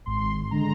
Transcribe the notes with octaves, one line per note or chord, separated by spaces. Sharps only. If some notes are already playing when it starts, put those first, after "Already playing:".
G#1 C6
D3 G#3 A#5